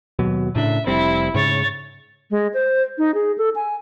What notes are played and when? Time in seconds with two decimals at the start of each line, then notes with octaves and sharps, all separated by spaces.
0.19 D#2 B2 F#3
0.56 A2 C#3 D4 E5
0.87 F1 G3 C4 E4
1.34 G#2 C#3 C#5 A6
2.31 G#3
2.54 C5
2.98 D#4
3.14 G#4
3.38 A4
3.55 G#5